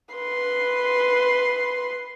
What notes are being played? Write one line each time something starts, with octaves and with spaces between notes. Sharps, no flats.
B4 C6